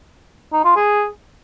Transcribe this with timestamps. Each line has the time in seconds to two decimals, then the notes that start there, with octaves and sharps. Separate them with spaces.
0.53 D#4
0.64 F4
0.76 G#4